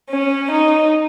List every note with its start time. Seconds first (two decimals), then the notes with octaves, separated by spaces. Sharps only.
0.11 C#4
0.51 D#4